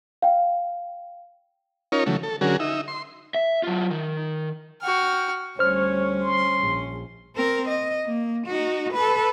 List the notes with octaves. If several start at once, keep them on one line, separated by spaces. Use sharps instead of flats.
F5 G5
C#4 D#4 F4 A#4 C#5
C#3 E3 F#3 A3
A4
D3 F#3 C#4 F#4 G#4 A#4
D#4 E5
C6
E5
F#3 F4
D#3
F#4 G5 F6
D2 G3 C#4 C5 C#5 F6
C6
A#1
C4 A#4
D#5
A#3
D#4 F#4
A4 B4